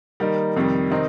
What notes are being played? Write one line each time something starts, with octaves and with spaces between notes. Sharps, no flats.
D#3 G3 A#3 D#4 A#4
F2 C3 D#3 G3
C3 D#3 C4 D#4 A#4